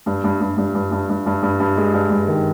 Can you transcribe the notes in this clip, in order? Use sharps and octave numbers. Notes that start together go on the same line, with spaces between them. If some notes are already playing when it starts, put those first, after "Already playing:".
G2
G2
G2
G2
G2
G2
G2
G2
G2
G2
G#3
G2
G2
D#3